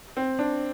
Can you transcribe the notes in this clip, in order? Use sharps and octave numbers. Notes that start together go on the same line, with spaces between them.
C4
D4